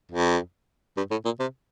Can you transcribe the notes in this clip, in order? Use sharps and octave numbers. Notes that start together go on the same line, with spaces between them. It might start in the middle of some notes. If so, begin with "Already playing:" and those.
F2
G2
A2
A#2
C3